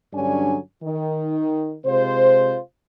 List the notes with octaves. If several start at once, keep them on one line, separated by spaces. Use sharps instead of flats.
G2 D3 F#3 C#4 D4 G#5
D#3
C3 G#3 F4 C5